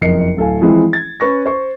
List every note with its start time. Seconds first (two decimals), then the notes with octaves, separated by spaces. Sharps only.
0.01 F#1 F2 A#4 D#5 C7 C#7
0.37 D1 A4 F5 G#5
0.61 E3 F3 G#3 C4 E4 G#4
0.93 G#6 A6
1.20 C#4 B4 C#6 A#6
1.46 C5 C#6